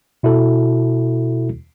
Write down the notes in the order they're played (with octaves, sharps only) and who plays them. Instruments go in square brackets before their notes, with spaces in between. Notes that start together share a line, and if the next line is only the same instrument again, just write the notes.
[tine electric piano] B2 E4 F#4 A4